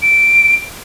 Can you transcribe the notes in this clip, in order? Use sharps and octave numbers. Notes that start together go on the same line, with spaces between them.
D7